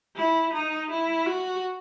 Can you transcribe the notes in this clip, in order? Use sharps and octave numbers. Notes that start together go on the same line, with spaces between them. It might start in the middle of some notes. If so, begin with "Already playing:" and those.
E4
D#4
E4
F#4